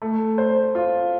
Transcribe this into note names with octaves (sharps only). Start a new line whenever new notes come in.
A3
C5
F4